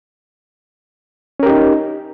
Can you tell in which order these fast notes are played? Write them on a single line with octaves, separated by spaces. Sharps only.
C#4 A#4 G4 D#4